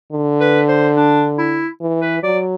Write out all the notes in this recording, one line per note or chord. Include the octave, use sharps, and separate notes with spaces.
D3
B4
C5
D4
E4
E3
B4
F#3 D5